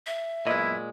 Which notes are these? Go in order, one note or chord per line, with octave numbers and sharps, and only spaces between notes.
E5
F#2 A#2 G#3 B3 E4 D#5